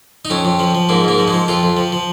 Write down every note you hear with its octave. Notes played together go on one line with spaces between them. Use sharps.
D#4
F2 C#4
F2
F3
F3
G#2 A#3
G#2 A#3
F3
G#3
F3
F2 F4
F2
F3
F3